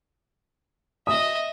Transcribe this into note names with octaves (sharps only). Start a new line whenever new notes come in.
D#5 E5 D#6